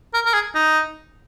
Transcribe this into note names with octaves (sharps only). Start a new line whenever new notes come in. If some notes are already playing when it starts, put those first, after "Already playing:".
A#4
A#4
G#4
D#4